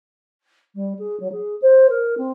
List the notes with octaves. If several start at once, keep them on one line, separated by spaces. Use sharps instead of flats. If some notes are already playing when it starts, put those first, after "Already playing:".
G3
G#4
F#3
G#4
C5
A#4
C4